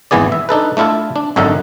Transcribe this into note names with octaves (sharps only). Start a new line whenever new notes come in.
G#1 E2 E3 B3 G#4 D5
E5
D4 D#4 A4 B4
A3 D4 E4 F4 A4
D4
G#1 F#2 D3 D#4 E5 F#5